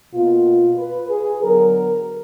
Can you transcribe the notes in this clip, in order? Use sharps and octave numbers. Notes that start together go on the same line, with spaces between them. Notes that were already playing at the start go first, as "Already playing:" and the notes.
B2 A#3 F4
B4
G#4
D3 F#3 B3 A#4